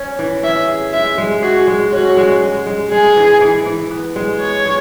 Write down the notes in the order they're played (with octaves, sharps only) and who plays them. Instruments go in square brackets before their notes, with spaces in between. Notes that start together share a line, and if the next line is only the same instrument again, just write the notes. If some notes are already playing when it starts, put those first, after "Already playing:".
Already playing: [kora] C#4
E3
[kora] C#4 [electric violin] E5
[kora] G#4
[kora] G#3 [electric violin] E5
[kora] G#3
[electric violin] F#4 [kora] G#4
[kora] G#3
[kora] C#4 [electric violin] F#4
[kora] G#3
G#3
G#3
[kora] G#3 [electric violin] G#4
[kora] E3
E3
E3
B3
G#3
[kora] B3 [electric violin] C#5
[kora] G#3